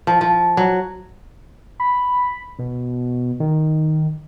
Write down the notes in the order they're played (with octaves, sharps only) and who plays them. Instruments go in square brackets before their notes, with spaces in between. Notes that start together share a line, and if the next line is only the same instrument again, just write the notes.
[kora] F3
F3
F#3
[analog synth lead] B5
B2
D#3